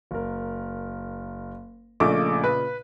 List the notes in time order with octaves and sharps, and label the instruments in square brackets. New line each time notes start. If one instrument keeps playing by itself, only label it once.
[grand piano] F#1 A#4
[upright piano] A#1 A3 D6 [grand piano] A#2 C#3 D#5
[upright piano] B4